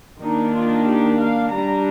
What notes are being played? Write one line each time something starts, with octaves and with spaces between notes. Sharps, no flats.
D#3 A#3 D4 D#4
F4
G4
F5
G3 D4 A#5